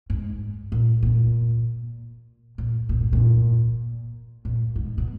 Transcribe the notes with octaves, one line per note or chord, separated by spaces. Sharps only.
G#2
A#2
A#2
A#2
A#2
G#2
A#2
A#2
G#2
B2